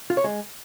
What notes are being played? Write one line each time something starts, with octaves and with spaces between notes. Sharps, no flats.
F4
C#5
G#3